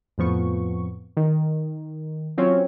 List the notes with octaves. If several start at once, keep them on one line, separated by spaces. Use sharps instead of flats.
F2 A2 F3 B3 C#6
D#3
F#3 C4 C#4 F4 C#5